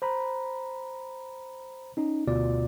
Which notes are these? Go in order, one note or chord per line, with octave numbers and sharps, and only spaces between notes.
C5 A#5 B5
C#4 D#4
D2 B2 F4 D5